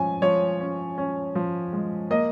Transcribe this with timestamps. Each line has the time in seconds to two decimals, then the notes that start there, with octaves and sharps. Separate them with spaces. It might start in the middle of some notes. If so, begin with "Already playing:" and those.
Already playing: F3 C#4 G#5
0.22 F3 C#5
0.61 C#4
0.98 C#4
1.35 F3
1.73 G#3
2.10 A#3 D#5